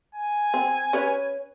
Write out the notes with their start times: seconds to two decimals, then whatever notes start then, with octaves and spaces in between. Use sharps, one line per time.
0.15 G#5
0.54 C4
0.93 C#4 B4 C#5